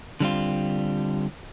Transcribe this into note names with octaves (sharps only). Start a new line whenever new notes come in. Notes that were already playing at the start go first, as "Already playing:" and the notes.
D3 G3 C4 F4